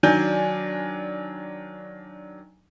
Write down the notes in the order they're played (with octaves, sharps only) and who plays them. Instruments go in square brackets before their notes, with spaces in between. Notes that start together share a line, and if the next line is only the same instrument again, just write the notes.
[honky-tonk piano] D#3 F#3 D4 G#5 G6